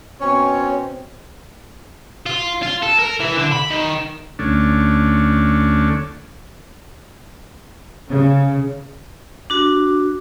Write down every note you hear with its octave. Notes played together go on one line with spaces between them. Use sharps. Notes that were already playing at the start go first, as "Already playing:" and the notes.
B2 C4 C#4 C#5
F4
F4
A4
A#4
E3
D3
B5
D#3
D2 A3 C#4 D4
C#3
D4 F#4